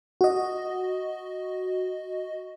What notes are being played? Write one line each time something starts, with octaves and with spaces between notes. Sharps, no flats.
F#4 D#5